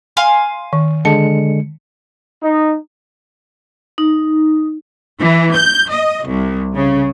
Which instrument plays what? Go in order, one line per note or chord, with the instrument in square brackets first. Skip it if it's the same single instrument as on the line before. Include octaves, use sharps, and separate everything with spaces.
[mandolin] F5 G#5 C6
[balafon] D#3
[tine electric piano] D3 G#3 C#7 [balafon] A5
[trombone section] D#4
[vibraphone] D#4
[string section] E3
G6
D#5
C2
C#3